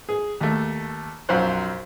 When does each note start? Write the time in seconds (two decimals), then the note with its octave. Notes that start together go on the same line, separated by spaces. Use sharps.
0.09 G#4
0.41 D#2 A3
1.29 B1 F#2 F3 F4 C5 F#6